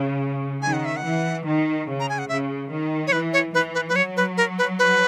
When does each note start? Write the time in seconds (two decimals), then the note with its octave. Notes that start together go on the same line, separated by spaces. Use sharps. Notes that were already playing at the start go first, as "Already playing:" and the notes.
Already playing: C#3
0.62 D#3 G#5
0.73 F#5
0.85 E5
0.96 F#5
1.03 E3
1.45 D#3
1.87 C#3
1.99 A#5
2.09 G#5
2.18 F#5
2.28 C#3 E5
2.70 D#3
3.07 C#5
3.12 E3 B4
3.33 C#5
3.53 E3 B4
3.74 B4
3.89 B4
3.95 F#3 C#5
4.17 B4
4.37 A#4
4.58 B4
4.79 B4